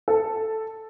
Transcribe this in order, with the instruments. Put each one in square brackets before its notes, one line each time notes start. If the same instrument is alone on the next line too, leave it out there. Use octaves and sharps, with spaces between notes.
[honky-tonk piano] A4